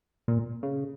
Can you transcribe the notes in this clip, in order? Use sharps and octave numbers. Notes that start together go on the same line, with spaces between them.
A#2
C#3